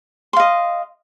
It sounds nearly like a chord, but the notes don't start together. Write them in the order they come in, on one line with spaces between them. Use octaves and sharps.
C6 F5 D#5